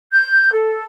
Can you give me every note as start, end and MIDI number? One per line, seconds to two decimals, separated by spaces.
0.12 0.51 91
0.53 0.84 69